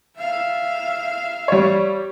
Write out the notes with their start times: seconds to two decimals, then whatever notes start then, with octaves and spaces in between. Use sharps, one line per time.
0.17 E5 F5
1.48 G3 C#5